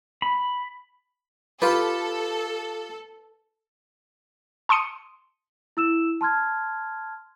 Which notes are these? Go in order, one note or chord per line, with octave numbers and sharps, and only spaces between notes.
B5
F4 G4 A4 B4
A5 C6 D#6 C#7 D#7
E4 E6 E7
A5 C6 F6 G#6